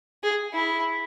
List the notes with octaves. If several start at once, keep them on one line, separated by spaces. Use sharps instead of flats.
G#4
E4